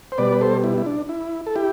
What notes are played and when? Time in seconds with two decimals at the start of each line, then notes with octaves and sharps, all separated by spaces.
0.12 C5
0.18 B2 G3 B4 D5
0.32 B4
0.41 A4 C5
0.64 E4
0.78 E4
0.86 D4
1.09 E4
1.46 A4
1.56 E4 G4